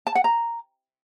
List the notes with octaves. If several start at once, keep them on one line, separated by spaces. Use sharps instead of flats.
A5
F#5
A#5